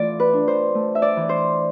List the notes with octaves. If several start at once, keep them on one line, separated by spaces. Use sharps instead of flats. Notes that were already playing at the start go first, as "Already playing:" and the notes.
Already playing: E3 A3 F4 D5
B4
D4
C5
A3
E5
D5
E3
C5